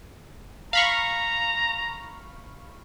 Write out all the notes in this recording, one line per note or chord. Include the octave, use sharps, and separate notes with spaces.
F5 A#5 B5 C#6